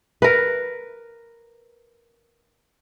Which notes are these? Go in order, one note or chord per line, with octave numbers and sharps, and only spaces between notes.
A#4 B4